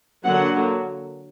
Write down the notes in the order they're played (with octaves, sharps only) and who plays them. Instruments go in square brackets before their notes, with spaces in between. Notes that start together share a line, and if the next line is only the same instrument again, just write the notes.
[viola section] D3 F#3 A#3 F#5